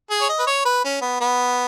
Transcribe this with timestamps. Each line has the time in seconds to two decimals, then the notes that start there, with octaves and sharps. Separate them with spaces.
0.10 G#4
0.21 C#5
0.29 D#5
0.39 B4
0.47 C#5
0.65 B4
0.84 C#4
1.01 B3
1.21 B3